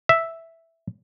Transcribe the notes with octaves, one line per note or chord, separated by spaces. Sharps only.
E5